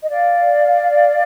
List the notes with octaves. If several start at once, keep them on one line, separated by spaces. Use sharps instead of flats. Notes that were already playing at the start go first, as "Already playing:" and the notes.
D#5
D5 F5